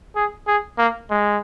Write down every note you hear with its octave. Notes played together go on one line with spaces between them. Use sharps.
G#4
G#4
A#3
G#3